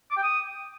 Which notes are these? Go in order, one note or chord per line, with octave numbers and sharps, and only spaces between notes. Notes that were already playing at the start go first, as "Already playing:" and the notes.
D6
G5
D#6